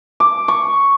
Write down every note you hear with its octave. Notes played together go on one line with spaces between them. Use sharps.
D6
C#6